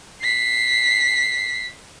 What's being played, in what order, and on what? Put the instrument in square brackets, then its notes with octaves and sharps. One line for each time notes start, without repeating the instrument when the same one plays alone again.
[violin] B6 C7